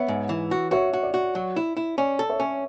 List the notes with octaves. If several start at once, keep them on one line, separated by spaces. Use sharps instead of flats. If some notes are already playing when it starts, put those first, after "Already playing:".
Already playing: B3 C#5 E5
G#2
E3
F#4
F#4 C#5 E5
F#4
D5
F#4
F#3
E4
E4
C#4 D5
A4
C#5 E5
C#4